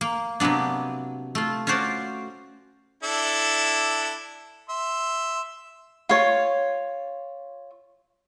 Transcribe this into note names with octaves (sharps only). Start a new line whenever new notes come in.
A#3
C3 F#3 A#3 B3 D4
A3 F4
C#4 F4 F#4 C5 D5
D4 E4 A4
E5 C6
F4 C#5